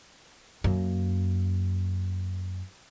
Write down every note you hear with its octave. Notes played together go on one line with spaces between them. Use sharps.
F#2 A#3